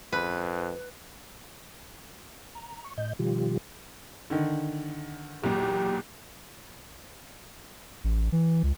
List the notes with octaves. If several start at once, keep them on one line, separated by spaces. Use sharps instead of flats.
F2 B4
A#5
C#6
A2 D#5 G6
B2 D#3 F3 G3 F4 G4
D3 D#3
B1 E2 A#2 G4
A1
E3
C#2